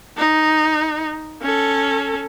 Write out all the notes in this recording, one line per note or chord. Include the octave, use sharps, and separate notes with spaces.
D#4
C#4 A4